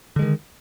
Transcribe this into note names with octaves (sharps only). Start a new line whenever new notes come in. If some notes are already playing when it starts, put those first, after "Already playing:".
D3 D#3 G#3